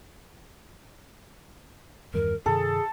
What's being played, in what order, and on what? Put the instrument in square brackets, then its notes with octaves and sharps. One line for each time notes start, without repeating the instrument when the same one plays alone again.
[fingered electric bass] E2 G2 D#3 [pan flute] A#4
[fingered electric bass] G2 C3 D#3 [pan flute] G#4 [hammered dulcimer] A4